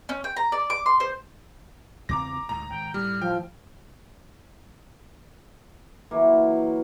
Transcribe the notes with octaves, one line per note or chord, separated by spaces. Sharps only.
C#4
G5
A#5
D5
D6
C6
C5
E2 C#3 C4 A#5 D6 A#6
D2 G#2 A#5
G#1 G5
A2 G3 F6
F3 G5
E3 F#3 A#3